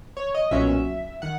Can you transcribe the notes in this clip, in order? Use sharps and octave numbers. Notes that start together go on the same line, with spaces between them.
C#5
D#5
B1 A#2 F#3 C#4 E5
D#3 F#5